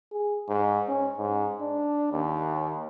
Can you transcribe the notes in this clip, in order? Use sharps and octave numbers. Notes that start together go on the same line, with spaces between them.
G#4
G#2
C#4
G#2
D4
D#2